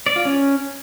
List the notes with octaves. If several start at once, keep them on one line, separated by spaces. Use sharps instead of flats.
D5
F4
C#4